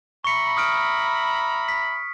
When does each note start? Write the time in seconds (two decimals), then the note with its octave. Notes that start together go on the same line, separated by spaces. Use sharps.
0.24 E5 A#5 B5 C#6 C#7
0.57 D#6 F6 D7
1.68 B6